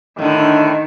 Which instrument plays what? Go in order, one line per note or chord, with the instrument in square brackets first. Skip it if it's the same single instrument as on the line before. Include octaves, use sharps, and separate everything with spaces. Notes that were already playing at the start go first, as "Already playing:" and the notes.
[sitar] A2 D3 [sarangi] D#3